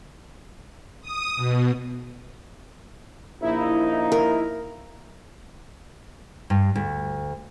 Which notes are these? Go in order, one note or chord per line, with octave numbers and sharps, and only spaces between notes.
D#6
B2
A#1 A#3 D#4 E4
A#4
G2
D2